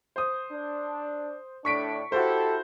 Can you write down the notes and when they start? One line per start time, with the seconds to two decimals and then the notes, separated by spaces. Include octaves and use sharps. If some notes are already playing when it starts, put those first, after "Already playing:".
0.16 C5 D#6
0.52 D4
1.65 A2 A3 D4 C#6 B6 D7
2.12 E4 F#4 G4 A4 C5